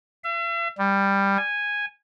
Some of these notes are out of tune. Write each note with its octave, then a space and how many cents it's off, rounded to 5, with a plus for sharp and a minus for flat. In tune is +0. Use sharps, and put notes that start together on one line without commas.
E5 +45
G3 +10
G#5 -10